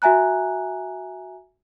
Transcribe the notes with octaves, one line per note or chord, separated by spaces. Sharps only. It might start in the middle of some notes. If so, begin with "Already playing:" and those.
F#4 E5 G#5 A#5 F#6